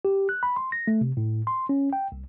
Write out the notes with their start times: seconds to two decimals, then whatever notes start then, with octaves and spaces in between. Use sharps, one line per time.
0.05 G4
0.29 F#6
0.43 B5
0.56 C6
0.72 A#6
0.87 A3
1.01 C3
1.17 A2
1.47 C6
1.69 C#4
1.93 G5
2.12 C2